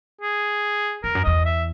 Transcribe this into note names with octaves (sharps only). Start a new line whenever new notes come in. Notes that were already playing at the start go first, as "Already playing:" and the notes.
G#4
E2 A#4
F#2
E2 D#5
E5